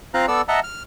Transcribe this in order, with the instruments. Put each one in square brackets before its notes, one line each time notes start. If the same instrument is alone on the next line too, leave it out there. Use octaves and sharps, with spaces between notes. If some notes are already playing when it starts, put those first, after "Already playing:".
[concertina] C4 F4 C5 F5 A#5 F#6
B3 A4 D5 E6
D#5 E5 F#5 A5 A#5
F6